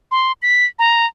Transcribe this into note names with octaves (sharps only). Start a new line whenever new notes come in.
C6
B6
A#5